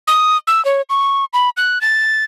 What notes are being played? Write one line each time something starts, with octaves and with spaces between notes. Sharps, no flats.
D#6
E6
C#5
C#6
B5
F#6
A6